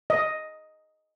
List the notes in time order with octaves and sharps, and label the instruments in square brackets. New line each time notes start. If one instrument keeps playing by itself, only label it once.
[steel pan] D#5